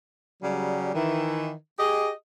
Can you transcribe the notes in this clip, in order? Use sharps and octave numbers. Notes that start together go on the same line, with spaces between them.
C#3 F#3 G3
D#3 E3
G4 G#4 D#5